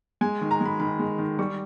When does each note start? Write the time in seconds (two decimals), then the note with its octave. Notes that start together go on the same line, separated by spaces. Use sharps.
0.21 G#3 G#5
0.41 D#3
0.51 A#5
0.60 G#3 B5
0.80 D#3 B5
0.99 G#3
1.18 D#3
1.39 G3 C#6